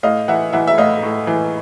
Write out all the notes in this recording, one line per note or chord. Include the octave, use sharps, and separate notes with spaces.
A2 D#5 F5
E3 E5 F#5
E3 E5 F#5
E5
A2 D#5 F5
A2
E3